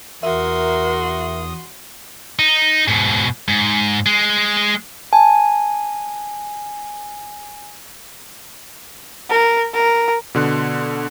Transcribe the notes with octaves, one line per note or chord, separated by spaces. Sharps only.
E2 F#4 A#4 E5 C6 D#6
D#4
G#2 B2
G#2
G#3
G#5 A5
A#4
A#4
B2 D3 C6 F#6